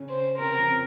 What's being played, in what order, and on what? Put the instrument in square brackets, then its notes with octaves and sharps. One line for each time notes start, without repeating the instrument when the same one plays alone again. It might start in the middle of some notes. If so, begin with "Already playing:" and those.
Already playing: [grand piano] C#3 C#4
[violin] C5
[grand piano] C3 C4 [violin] A#4
[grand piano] F2 F3